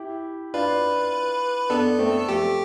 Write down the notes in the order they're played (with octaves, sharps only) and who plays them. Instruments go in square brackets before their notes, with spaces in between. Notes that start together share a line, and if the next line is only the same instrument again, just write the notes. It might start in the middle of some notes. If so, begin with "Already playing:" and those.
Already playing: [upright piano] E4 G4
[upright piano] D4 F4 [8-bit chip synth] B4
[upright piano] B3 D4 [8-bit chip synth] A4
[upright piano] A3 C4
[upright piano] F3 A3 [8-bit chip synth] G4